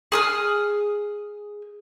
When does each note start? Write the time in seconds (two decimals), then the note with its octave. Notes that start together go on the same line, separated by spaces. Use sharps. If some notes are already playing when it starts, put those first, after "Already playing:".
0.12 G#4 D#6 F6